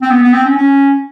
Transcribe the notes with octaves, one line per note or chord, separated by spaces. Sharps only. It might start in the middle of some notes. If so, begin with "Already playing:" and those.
C4
B3
B3
C4
C#4
C#4